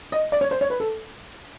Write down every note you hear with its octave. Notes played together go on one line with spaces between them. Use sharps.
D#5
D5
C#5
C5
C#5
B4
A4